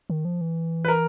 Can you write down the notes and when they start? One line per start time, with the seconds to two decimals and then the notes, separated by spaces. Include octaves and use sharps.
0.10 D#3
0.25 F3
0.41 E3
0.85 B4
0.88 A#4